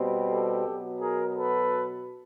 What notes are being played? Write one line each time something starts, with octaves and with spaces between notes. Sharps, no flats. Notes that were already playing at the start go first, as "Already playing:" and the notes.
Already playing: B2 G3 C4
G4 A4
B2 F#3 B3
G#4 A#4
A4 B4